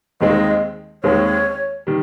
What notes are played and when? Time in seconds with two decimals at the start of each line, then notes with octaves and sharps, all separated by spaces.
0.21 D#2 D#3 G#3 C4 D#5
1.04 D#2 D#3 G#3 C4 C#5
1.87 D#3 G3